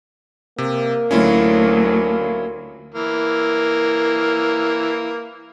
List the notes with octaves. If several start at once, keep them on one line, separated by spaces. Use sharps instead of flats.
C3 A#3
D2 F#3 C#4 E4 F4
E3 A#3